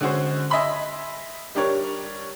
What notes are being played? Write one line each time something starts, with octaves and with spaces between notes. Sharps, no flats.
D3 G#3 C#4 F#4 G#4 C5
D#5 E5 G#5 B5 C6
G3 D4 G4 A#4 C#5